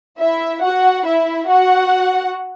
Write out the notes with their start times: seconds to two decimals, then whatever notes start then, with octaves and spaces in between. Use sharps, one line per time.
0.19 E4 E5
0.62 F#4 F#5
1.05 E4 E5
1.48 F#4 F#5